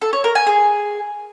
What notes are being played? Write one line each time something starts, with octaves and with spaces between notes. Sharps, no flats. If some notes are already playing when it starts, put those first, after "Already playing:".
A4
C#5
A#4
G#5
G#4